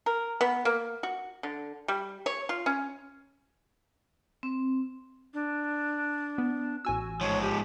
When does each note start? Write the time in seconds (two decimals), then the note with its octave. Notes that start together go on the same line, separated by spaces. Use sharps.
0.06 A#4
0.41 B3
0.65 A#3
1.03 F#4
1.43 D3
1.88 G3
2.26 C#5
2.49 F4
2.66 C#4
4.43 C4
5.34 D4
6.38 B3
6.85 A1 F#4 G#5 E6
7.21 G#2 F3 C#5
7.42 G4